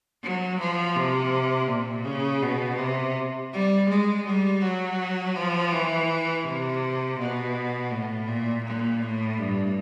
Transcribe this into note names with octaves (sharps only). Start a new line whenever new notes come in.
F#3
F3
C3
A#2
C#3
B2
C3
G3
G#3
G3
F#3
F3
E3
C3
B2
A2
A#2
A#2
A2
G2